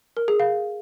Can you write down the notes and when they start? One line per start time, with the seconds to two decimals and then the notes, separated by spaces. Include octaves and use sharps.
0.17 A#4
0.28 G#4
0.40 F5